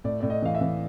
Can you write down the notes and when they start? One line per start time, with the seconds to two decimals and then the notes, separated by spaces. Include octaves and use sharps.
0.04 A2 D5
0.20 A2 D5
0.30 D#5
0.42 E3 F5
0.55 E5
0.61 E3